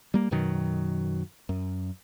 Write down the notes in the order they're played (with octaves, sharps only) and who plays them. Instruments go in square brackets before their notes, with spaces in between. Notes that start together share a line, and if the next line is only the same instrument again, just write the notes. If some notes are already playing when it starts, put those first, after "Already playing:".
[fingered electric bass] G3 A#3
F#2 B2 D#3 F#3
F#2